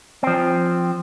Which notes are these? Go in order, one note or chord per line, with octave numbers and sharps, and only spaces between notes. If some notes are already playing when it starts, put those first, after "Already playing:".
F3 C4